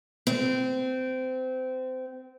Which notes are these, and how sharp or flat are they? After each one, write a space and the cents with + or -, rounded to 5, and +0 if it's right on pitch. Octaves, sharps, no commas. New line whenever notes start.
C4 -25